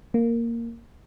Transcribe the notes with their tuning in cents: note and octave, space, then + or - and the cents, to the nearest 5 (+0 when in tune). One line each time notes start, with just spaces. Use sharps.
A#3 -5